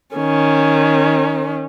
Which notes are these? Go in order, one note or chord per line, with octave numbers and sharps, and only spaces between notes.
D#3 C#4